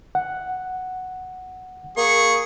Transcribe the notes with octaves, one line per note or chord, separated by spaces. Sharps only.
F#5
A#3 G#4 C#6